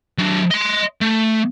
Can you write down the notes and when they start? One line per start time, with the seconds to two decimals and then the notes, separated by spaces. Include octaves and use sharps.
0.18 F#3 D4
0.51 D#5 C6
1.01 A3